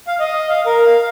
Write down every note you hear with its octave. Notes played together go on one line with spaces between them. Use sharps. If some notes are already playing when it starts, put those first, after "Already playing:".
F5
D#5
F5
A#4
F5